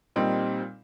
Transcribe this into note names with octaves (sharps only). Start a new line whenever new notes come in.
A#2 G3 C4 D#4